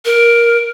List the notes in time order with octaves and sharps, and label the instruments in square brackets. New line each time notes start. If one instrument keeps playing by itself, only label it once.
[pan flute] A#4